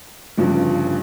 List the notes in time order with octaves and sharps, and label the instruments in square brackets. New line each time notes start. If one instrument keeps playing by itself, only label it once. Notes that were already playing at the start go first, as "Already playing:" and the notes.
[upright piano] G1 G2 C#3 F3